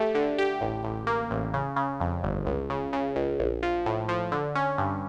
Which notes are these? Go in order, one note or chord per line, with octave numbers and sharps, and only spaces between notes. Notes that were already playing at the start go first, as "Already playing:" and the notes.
Already playing: A3 G4
D3
G4
A1
A1
A#3
A1
C#3
C#3
F2
G1
C#2
C#3
C#3
C#2
A#1
F3
A2
F3
D3
C#4
G2